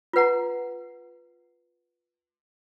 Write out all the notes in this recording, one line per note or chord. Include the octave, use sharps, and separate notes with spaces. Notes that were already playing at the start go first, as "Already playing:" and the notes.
F4 B4 F#5 A#5